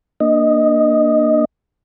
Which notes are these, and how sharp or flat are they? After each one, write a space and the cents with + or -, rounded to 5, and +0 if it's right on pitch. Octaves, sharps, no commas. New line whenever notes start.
A#3 +0 D4 +15 D#5 +0